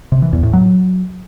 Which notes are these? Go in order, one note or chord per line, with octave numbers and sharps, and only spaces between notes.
C3
E3
E2
A2
F#3